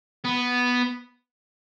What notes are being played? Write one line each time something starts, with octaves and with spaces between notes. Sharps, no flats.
B3